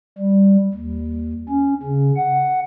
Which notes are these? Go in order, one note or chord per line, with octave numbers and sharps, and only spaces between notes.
G3
D#2
C#4
C#3
F#5